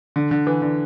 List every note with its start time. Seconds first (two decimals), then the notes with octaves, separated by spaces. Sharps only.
0.16 D3
0.31 D3
0.47 E3
0.62 D3